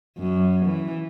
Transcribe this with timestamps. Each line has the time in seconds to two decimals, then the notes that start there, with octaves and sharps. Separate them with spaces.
0.18 F#2
0.66 E3